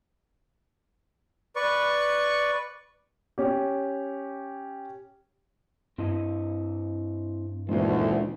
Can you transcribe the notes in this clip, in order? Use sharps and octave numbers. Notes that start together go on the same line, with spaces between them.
B4 D5 C#6
C#4 G4
G2 C4 E4 D#5
D2 A#2 D#3 E3 G#3 C#4 C5